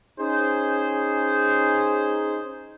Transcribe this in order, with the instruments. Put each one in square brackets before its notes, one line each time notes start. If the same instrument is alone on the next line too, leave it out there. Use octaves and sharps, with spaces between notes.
[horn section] C#4 D#4 G#4 C5